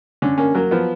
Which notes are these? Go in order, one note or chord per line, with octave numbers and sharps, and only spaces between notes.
D3 C#4
A#3 C#4
F#3 A#3
F3 B3